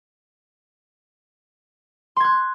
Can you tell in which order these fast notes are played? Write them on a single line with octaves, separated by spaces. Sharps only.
C6 G#6 F#6